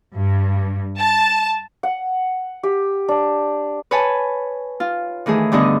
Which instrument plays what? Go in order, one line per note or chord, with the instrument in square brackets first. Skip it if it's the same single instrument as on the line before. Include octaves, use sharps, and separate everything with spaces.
[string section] G2
A5
[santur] F#5
G4
D4
[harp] B4 C#5 G#5 A5
F4
D#3 E3 A3 G#4
G2 D3 B3 D#5